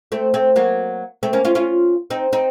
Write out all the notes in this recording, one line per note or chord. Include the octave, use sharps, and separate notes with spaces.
A3 C4
A3 C4
F#3 A#3
A3 C4
A#3 C#4
C#4 F4
C#4 F4
C4 D#4
C4 D#4